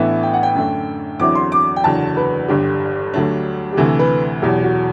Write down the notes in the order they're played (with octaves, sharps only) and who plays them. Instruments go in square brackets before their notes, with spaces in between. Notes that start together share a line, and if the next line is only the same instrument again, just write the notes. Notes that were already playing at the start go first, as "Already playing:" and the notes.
Already playing: [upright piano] A1 A2 E3 B3 D4 [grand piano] E5
[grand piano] G5
F#5
G5
[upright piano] F#2 D3 A3 D4
[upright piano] E2 D3 F#3 C4 E4 [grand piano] D6
[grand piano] C6
D6
G5
[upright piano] F#1 E2 D3 F#3 [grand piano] A5
[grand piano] B4
[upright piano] G1 G2 D3 [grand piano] G4
[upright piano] D2 D3 F#3 A3 D4
[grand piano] G4
[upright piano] D2 C3 E3 A3 [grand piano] A4
[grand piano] B4
[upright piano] E2 B2 F#3 [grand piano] G4
[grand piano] F#4